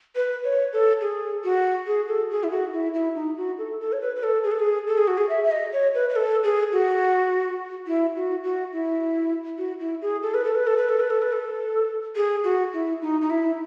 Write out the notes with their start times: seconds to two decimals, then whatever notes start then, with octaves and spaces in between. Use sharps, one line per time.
0.16 B4
0.44 C#5
0.73 A4
1.01 G#4
1.44 F#4
1.87 G#4
2.08 A4
2.30 G#4
2.44 E4
2.51 F#4
2.73 E4
2.94 E4
3.15 D#4
3.37 F#4
3.58 A4
3.80 A4
3.93 C#5
4.01 B4
4.16 B4
4.23 A4
4.44 G#4
4.51 A4
4.59 G#4
4.87 A4
4.98 G#4
5.08 F#4
5.18 G#4
5.29 E5
5.44 E5
5.51 D#5
5.73 C#5
5.94 B4
6.10 B4
6.16 A4
6.44 G#4
6.72 F#4
7.87 E4
8.16 F#4
8.44 F#4
8.73 E4
9.58 F#4
9.80 E4
10.02 G#4
10.23 A4
10.34 B4
10.44 A4
10.55 B4
10.67 A4
10.77 B4
10.89 A4
11.00 B4
11.10 A4
11.22 B4
11.33 A4
12.16 G#4
12.44 F#4
12.74 E4
13.02 D#4
13.21 D#4
13.30 E4